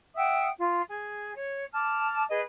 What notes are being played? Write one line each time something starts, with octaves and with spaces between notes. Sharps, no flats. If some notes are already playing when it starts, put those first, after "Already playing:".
E5 F#5 G5 D#6
F4
G#4
C#5
A5 D6 F6
G#4 B4 D#5